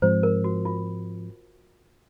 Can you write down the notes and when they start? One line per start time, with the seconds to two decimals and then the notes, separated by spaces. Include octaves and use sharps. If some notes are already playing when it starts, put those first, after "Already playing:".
0.02 G#2 F3 G#3 C4 C5
0.23 A#4
0.44 F#4
0.65 F4